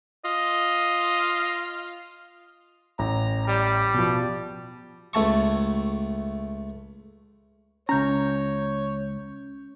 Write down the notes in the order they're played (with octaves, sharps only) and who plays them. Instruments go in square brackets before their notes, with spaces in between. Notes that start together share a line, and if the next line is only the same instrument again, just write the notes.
[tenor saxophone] F4 [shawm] D#5
[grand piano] A1 [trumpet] A#5
[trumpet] G3
[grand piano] B2 F3
[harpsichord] C#2 A3 A5 C#6
[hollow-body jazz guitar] C#2 A#5 [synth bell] C#4 G6 [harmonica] C#5